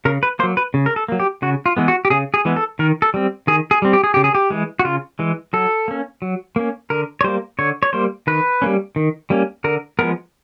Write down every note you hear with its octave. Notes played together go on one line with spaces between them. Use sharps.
C#3 A#4
B4
F#3 A#3 C5
B4
C#3
A#4
A4
F#3 A#3
G4
C#3 F#4
F4
E3 G#3 B3
F#4
G4
C#3 G#4
G#4
E3 G#3 B3
A4
D#3 A#4
A4
G3 C4
D#3 G#4
G#4
G3 C4
G4
G#4
C#3 G4
G#4
G4
E3 G#3
F#4
C#3 F4
E3 G#3
F#3 A4
A#3 C#4
F#3
A#3 C#4
D3 A#4
C#5
G3 A#3 C5
D3 C#5
C#5
G3 A#3 C5
D#3 B4
G3 A#3 C#4
D#3
G3 A#3 C#4
D3 A#4
F3 G#3 B3 A#4